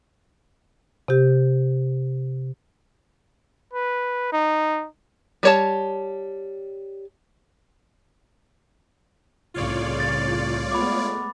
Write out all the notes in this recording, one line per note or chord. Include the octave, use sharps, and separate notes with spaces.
C3 G4
B4
D#4
G3 C#5 A5
C2 A2 C#3 F4 C#5 D5
A6
G#3 A3 B3 B5 D6